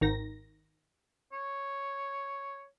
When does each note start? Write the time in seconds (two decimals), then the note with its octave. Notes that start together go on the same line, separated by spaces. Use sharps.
0.01 G#1 D#3 A#6
1.33 C#5